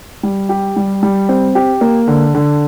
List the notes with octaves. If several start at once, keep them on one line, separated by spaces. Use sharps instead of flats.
G3
G4
G3
G3
C4
G4
A#3
D3
D3